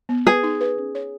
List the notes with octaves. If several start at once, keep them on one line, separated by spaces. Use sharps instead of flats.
B3
G#4 B4
D#4
B4
C#4
C#5